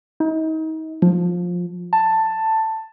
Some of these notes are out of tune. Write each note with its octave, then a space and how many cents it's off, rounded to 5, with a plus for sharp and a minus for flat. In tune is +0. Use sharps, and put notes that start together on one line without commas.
D#4 +35
F3 +15
A5 +10